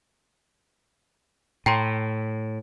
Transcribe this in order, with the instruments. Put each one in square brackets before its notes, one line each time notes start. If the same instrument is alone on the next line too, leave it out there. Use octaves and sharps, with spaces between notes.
[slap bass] A2 [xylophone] G5 A#5 C6